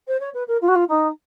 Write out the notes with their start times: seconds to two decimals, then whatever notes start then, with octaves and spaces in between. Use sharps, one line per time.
0.07 C5
0.20 C#5
0.34 B4
0.48 A#4
0.61 F4
0.68 F#4
0.75 F4
0.89 D#4